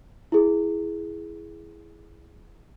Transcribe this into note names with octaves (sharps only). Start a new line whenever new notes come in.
E4 G#4